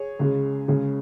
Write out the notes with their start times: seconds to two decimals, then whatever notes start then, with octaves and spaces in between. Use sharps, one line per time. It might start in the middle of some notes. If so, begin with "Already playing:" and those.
Already playing: G#4 C#5
0.19 C#2 C#3 G#3
0.68 C#2 C#3 G#3